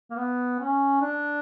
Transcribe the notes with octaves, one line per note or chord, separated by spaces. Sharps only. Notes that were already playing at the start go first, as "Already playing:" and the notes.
A#3
B3
C#4
D4